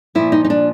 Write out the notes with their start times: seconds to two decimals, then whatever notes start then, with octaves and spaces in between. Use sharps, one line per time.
0.15 A#2 F3 E4
0.32 D#4
0.45 D#4
0.50 D4